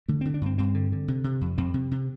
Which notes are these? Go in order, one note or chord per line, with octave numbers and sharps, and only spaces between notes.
D3 A3
D3 C4
D4
G2 C4
G2 C4
D3
D3
C3
C3
F2
F2 C4
C3
C3